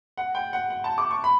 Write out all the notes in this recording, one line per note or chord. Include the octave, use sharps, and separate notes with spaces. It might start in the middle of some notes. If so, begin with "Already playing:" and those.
F#5
G5
F#5
F#5
A5
D6
C#6
B5